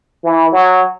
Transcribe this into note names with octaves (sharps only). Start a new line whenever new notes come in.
E3
F#3